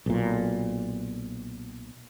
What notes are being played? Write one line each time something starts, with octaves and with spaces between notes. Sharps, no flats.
B1 A#2